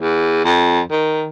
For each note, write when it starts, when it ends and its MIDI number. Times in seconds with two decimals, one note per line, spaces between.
0.01 0.43 40
0.44 0.80 41
0.91 1.29 51